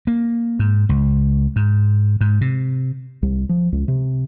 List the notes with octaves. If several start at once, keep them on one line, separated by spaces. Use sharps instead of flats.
A#3
G#2
C#2
G#2
G#2
C3
C2
F3
C#2
C3